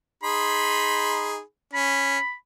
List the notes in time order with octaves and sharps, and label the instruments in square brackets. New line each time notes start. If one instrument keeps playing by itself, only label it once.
[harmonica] D#4 G#4 B5 [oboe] C6
[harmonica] C#4 [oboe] B5